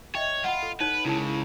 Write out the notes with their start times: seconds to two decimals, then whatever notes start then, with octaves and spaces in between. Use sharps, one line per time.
0.15 C#5 D#5 E5 G5
0.44 F4 F#5 B5
0.63 A4
0.80 D#4 B4 C#5
1.05 C#2 C#3 E4 A#4 A5